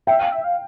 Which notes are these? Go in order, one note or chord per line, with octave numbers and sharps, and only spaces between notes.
E5 G5
F5
E5
F5